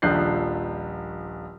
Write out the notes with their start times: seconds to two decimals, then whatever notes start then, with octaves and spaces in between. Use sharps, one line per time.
0.02 D#1 A#1 F3 F#6 G6 C7